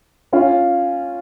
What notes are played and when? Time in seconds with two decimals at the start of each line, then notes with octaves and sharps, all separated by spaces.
0.33 C#4 F4